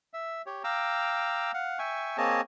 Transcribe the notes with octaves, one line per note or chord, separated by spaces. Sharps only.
E5
G4 C#5
F5 G5 A#5 D6 E6
F5 F#5
E5 G5 G#5 C#6
A#3 C4 G#4 C#5 D#5 A5